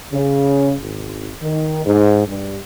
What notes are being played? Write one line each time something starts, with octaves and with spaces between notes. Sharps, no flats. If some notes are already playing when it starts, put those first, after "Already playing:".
C#3
G#1
D#3
G#2
G2